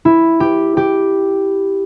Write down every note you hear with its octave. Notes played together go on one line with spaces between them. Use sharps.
E4
G4
G4